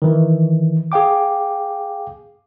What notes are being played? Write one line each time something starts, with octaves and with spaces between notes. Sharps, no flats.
D#3 E3
G#4 F5 G5 D6